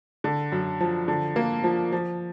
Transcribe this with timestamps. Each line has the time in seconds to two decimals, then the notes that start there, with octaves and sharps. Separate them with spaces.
0.24 D3
0.52 F#2
0.80 F3
1.08 D3
1.36 A#3
1.64 F3
1.92 F3